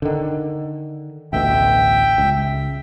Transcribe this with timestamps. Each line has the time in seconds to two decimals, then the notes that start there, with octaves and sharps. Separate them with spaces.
0.02 D3 D#3
1.33 A1 D2 B2 E5 G5
2.18 C#2